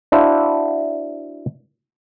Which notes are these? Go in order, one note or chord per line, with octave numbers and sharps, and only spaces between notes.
D4 E4 F#4 C5 F5